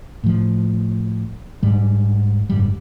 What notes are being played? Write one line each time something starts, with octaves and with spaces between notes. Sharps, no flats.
A2 F3
G#2 G3
F#1 G#2 G3